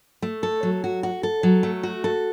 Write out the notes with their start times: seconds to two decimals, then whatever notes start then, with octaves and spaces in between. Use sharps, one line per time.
0.22 A3
0.43 A4
0.63 F#3
0.84 F#4
1.03 F#4
1.23 A4
1.43 F#3
1.63 A3
1.83 F#4
2.04 A4